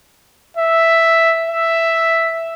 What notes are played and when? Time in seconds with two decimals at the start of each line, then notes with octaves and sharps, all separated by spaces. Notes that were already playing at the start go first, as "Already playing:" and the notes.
0.57 E5
1.50 E5